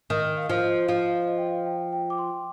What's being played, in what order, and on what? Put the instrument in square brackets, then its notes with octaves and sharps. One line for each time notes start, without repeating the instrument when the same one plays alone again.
[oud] D#3 [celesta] D#5
[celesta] F5
D#5
[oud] F3 [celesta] F5
[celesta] D#5
[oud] F3 [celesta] F5
[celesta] F5
D#5
G5
F5
G5
G5
D6
C6